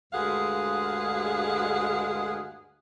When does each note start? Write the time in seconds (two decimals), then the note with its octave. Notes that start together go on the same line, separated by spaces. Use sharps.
0.13 D2 G2 G#3 G#4 F5 F#5